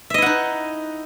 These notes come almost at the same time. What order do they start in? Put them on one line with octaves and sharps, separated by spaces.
E5 D#5 E4 F#5 D#4